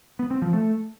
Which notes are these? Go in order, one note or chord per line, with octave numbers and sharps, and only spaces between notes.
B3
C4
F3
A3